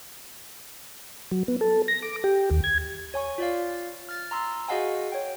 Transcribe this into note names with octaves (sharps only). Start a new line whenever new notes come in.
F#3
B3
A4
A#6
D6
G4
D#2
G#6
C#5 G#5 C#6
F4 D5 F5
F6 A6
A#5 C6 E6
F#4 G#4 D#5 F5 F#5 G#5
C#5 G5